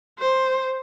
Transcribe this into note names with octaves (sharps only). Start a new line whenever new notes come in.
C5